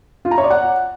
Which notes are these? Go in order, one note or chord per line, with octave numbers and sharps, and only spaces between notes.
F4
A#5
C#5
D5
F#5